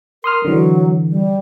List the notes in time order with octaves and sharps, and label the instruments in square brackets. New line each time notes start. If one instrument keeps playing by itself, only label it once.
[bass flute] A#4 [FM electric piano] C6 D#6 F6
[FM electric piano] D3 E3 [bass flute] F#3
[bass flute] G3